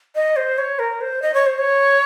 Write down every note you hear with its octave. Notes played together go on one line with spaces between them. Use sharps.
D#5
C5
C#5
A#4
C5
D#5
C#5
C5
C#5